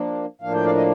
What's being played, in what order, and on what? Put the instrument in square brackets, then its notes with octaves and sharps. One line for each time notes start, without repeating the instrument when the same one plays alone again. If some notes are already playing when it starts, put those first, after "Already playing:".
Already playing: [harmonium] F3 A#3 D4
A2 F3 A#3 D4 F5
G5
D5 F5
D#5